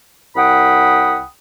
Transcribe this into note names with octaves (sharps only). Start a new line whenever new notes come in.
C2 F#5 G5 B5 D#6